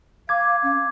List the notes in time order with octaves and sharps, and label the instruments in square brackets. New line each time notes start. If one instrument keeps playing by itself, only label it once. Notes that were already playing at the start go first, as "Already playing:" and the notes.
[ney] F5 [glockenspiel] D6 G#6
[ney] C#4